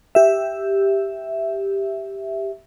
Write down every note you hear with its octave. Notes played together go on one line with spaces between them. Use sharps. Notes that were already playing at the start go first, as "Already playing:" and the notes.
G4 E5